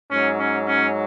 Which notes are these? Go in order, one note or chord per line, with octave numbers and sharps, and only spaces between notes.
G#2 F#3 C#4
C#4
C#4